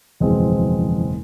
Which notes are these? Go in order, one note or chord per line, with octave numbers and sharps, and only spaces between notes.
F#1 E2 B2 F3 G#3 C4